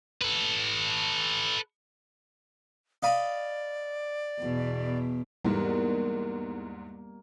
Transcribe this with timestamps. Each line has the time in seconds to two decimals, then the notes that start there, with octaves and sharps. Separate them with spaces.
0.22 A4 B4
3.03 D5 D#5 F5 B5
4.40 E2 B2
5.45 E2 G#2 G3 A#3 B3